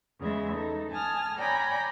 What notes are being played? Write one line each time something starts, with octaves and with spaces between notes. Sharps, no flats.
E2 C#3 G#3 E5
D#4 A4
G#5 A5 D#6 F6
C#5 D5 G5 G#5 A#5 B5